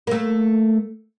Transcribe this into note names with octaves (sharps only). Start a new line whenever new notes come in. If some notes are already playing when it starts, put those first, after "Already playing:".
A3 A#3